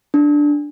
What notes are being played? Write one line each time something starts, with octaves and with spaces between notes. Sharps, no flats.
D4